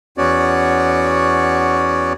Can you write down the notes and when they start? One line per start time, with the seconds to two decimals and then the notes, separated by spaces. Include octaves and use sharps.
0.18 E2 B3 C#4 F#4 C#5 D5